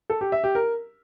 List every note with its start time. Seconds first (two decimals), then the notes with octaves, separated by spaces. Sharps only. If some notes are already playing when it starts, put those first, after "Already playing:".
0.10 A4
0.21 G4
0.32 E5
0.44 G4
0.55 A#4